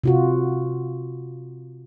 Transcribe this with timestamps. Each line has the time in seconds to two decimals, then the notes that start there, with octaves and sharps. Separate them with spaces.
0.04 C3 F4 F#4